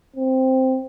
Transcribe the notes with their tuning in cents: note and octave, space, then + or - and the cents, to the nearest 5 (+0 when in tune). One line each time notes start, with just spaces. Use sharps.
C4 -5